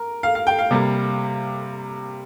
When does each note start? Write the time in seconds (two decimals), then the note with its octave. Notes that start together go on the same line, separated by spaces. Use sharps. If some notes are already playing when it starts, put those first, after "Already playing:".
Already playing: A#4
0.23 F5
0.35 F5
0.47 G5
0.59 F5
0.71 C3 G3 A#3